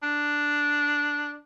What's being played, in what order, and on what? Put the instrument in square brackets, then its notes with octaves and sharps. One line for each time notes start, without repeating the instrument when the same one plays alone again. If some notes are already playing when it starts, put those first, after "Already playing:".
[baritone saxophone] D4